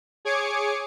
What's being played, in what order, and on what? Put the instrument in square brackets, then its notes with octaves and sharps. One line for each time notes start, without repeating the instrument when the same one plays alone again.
[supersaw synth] G#4 C#5 G#5 D6 C#7